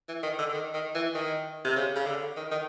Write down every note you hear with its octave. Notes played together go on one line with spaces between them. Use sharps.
E3
D#3
D3
D#3
D#3
E3
D#3
C3
C#3
C#3
D3
D#3
D#3